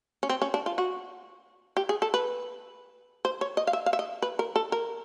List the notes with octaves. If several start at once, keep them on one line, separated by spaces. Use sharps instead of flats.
C#4
C4
C#4
D4
F4
F#4
G4
G#4
A4
B4
C5
C#5
D#5
F5
E5
F5
E5
D#5
B4
A#4
A4
A#4